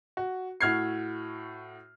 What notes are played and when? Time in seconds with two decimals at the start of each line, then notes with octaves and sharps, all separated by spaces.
0.17 F#4
0.61 A2 F#4 F6 G#6 C7